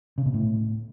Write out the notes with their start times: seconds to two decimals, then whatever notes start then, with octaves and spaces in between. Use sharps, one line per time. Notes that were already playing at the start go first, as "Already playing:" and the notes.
0.18 C#3
0.26 B2
0.34 A2